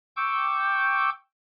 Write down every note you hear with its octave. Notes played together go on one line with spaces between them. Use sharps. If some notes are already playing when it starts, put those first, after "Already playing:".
G5 C#6 D6 E6 G6